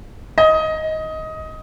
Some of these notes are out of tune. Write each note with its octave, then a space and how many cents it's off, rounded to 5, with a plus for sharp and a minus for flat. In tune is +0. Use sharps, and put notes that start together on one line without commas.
D#5 +15